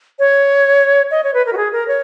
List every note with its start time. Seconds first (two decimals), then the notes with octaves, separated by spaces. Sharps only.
0.19 C#5
1.11 D#5
1.24 C#5
1.34 B4
1.46 A#4
1.53 F#4
1.57 G#4
1.73 A#4
1.88 C#5